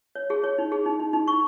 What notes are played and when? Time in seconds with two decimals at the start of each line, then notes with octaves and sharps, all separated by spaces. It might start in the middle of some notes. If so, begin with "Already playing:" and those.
0.15 C#5
0.30 G#4
0.44 C#5
0.58 D#4
0.72 G#4
0.86 D#4
1.00 D#4
1.13 D#4
1.28 C#6